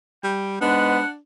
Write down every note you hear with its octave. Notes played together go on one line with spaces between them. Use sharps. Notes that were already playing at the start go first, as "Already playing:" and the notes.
G3 G5
G#2 G#3 B3 D4 F#5